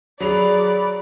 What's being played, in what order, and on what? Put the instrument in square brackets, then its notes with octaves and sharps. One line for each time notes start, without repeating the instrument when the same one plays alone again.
[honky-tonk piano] F#3 F7 [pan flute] G#4 [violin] D5 [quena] B5